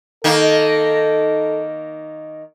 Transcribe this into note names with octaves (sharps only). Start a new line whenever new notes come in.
D#3 A#3 A4